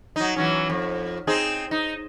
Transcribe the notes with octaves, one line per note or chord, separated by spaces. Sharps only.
F#3 D#4
E3 F#3 C#4
F2
C4 D#4 G#4
D#4